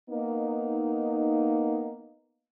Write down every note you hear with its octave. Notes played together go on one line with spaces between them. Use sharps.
A#3 B3 D#4